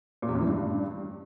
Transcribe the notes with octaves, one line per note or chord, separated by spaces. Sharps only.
A#2
E2
F#2
E3
G2